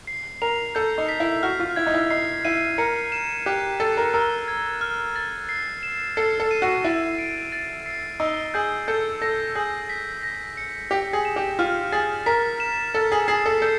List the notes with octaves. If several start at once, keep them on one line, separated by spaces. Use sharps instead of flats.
C7
A#4 F7
A4 G6
D#4
B6
E4
F#4 F6
F4
E4 G#6
D#4
E4
D#4 C7
E4 D#7
A#4 C#7
E7
G4 F#6
A4 A6
A#4
A#4 E6
G#6
F6
A6
C7
E7
A4 C7
A4
D#7
F#4
E4 A6
D7
A6
C7
D#4 E6
G#4 G6
A4 G6
A4 A#6
G#4 G6
B6
A#6
C#7
G4 B6
G#4
E7
G4
F4 F6
G#4 A6
A#4 B6
E7
A4 A6
G#4
G#4 C7
A4
A4 G6